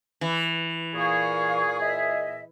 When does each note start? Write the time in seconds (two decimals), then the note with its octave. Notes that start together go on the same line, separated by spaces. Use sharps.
0.21 E3
0.94 A#2 G#4 F5 C#6
1.80 D#5 E5